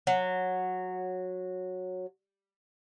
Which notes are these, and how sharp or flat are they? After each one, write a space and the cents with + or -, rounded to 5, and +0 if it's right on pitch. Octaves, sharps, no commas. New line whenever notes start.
F#3 -10